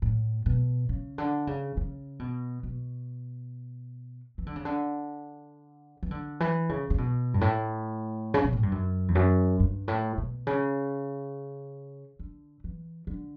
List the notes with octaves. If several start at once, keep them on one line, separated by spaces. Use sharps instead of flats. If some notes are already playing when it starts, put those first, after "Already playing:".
A2
B2
C#3
D3
C#3
C#3
B2
B2
E3
D3
C#3
D3
E3
D3
E3
C#3
C#3
B2
G2
A2
C#3
B2
A2
G2
F#2
E2
F#2
G2
A2
B2
C#3
D3
E3
D3